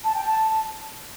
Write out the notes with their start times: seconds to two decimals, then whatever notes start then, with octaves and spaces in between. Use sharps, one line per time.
0.04 A5
0.14 G5
0.25 A5